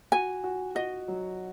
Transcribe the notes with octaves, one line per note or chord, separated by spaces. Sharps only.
F#4 G#5
F#4
F#4 D#5
F#3